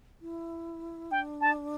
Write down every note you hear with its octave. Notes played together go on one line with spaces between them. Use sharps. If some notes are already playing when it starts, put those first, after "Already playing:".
E4
D4 G5
A5